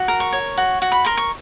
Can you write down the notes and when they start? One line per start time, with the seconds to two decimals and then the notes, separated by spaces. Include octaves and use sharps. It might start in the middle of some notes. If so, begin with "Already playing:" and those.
Already playing: F#4
0.08 A#4
0.20 C#6
0.32 C#5
0.57 F#4
0.82 F#4
0.92 B5
1.05 A#4 C6
1.17 C#6